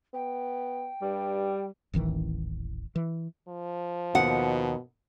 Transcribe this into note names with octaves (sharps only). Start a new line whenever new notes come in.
B3 G5
G2 G3
D#1 A1 D#3 E3
E3
F3
D#2 B2 F#5